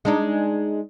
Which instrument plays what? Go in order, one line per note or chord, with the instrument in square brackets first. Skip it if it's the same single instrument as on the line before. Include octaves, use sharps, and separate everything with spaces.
[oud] G#3 D4 D#4